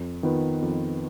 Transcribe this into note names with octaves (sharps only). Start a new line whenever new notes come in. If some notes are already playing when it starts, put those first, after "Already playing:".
Already playing: F2
D#3 B3 F4 B4
F2